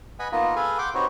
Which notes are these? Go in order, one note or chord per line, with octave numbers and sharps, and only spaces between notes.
B4 D#5 F#5 G#5 B5
A#3 B3 D#4 F4 D#5
G#4 A4 B4 F5 G#5
F#5 G5 C6 D6
C4 D#4 F#4 G4 B4 C#5